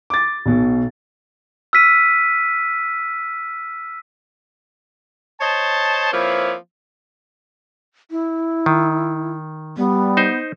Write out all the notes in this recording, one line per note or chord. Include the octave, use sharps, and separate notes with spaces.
D6 A6
B1 B2
E6 F6 B6 D#7
C5 C#5 D#5 A5
F3 A#3 C4 E4 B4 C#5
E4
D#3
G3 B3
D#4 C5